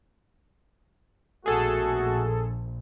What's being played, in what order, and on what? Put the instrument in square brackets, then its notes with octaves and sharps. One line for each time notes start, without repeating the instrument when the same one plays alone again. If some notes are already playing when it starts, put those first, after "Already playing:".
[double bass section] A#1 [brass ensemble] B2 A3 F#4 [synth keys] G#4 A4